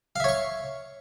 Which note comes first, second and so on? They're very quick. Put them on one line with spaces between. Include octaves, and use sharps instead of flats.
F5 E5 C#5 C#6